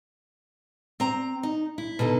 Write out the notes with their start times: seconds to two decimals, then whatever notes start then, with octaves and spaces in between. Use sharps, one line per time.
1.00 C4 A#5
1.43 D#4
1.78 E4
1.99 B2 D3 D#4 A4